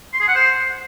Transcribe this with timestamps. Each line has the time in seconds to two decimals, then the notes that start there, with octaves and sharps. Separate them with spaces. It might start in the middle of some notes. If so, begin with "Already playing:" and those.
0.14 C6
0.21 G#4
0.28 F#5
0.35 C5